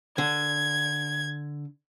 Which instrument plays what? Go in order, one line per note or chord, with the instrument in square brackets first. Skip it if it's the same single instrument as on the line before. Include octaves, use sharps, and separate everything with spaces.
[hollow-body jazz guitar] D3 [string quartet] G#6